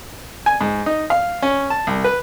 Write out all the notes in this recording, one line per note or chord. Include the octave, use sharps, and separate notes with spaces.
G#5
G#2
D#4
F5
C#4
A5
C2
B4